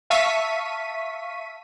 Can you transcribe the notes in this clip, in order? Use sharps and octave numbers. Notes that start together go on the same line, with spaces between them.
E5 F5 A5 C#6 B6 D#7